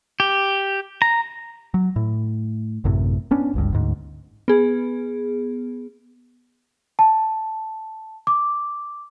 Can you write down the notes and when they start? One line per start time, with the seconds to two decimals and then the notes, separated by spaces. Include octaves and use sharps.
0.20 G4
1.02 A#5
1.74 F#3
1.96 A2
2.84 A1 F#2 A2 C3
3.31 B3 C#4 D4
3.54 G1 C#2 G2
3.72 D2 G#2
4.48 B3 G#4
6.99 A5
8.27 D6